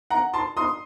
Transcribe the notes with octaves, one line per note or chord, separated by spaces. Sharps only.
F#5 A#5
A5 C6
C6 D#6